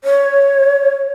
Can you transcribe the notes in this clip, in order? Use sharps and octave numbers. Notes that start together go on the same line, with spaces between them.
C#5